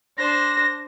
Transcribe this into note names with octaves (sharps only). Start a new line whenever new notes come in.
D4 C5 A#6